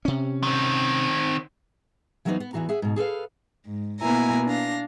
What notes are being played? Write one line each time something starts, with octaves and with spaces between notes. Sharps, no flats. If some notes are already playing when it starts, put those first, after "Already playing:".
C3 C#4
D#3 C4
E3 F#3 A#3 B3 D#4 C5
B3
E2 G2 E3 F#4 A#5
G#4 E5 F#5
G#2 B2
G#4 A4 B4 F5
G#2
B2 A#3 B3 E4 G#5 A#5
D4 F5 A#6